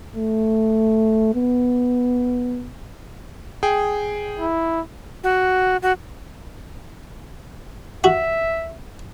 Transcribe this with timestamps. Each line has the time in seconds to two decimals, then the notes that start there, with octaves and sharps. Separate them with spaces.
0.16 A3
1.35 B3
3.63 G#4 G5
4.40 E4
5.24 F#4
5.82 F#4
8.04 F#4 E5